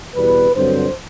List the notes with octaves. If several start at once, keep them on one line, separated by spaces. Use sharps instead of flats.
E2 B2 G3 B4
G2 D3 F#3 C4 C5